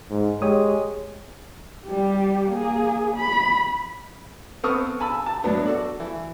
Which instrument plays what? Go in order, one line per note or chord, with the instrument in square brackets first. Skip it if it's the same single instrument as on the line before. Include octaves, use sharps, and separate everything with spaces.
[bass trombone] G#2
[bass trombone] G#3 [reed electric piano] G4 C#5 D#6
[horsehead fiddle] G3 G4
A#3 G#4
B5
[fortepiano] B3 C4 A4 C#6 D#6 F6
G#5 A5 B5 E6
A5
A2 F#3 B3 D4
F#4 A4 D5
E3